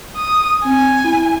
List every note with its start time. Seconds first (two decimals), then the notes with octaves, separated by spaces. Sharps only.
0.16 D#6
0.65 C4 G#5
1.04 E4